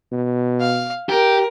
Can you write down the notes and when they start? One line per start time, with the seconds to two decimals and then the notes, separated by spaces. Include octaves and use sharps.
0.12 B2
0.60 F5
1.09 G4 A#4